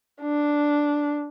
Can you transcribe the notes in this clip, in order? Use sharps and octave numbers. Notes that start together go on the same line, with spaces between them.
D4